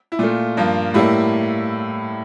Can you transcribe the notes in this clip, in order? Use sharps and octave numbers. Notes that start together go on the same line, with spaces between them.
E4
A#2 A3 F4
G2 F3 A#3
A2 G3 A#3 E4